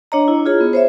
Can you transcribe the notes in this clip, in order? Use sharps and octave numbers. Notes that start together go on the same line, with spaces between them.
D4 C#5 D#5 A#5
E4
F4 G#4 C#5
B3
C5 C#5 E5